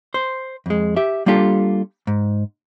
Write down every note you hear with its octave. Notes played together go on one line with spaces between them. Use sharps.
C5
F2 G#3
G4 E5
G3 A#3 D4 F4 G4 A4
G#2